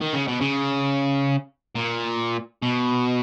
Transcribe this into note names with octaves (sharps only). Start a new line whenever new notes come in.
D#3
C#3
B2
C#3
A#2
B2